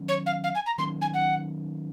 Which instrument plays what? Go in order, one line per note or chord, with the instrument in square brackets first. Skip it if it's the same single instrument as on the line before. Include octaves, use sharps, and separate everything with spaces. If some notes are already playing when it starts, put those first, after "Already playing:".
Already playing: [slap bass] D#3 F#3 C#4
[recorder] C#5
F5
F5
G#5
A#5
[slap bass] D#3 F#3 A#3 C#4 [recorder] C6
[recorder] G#5
F#5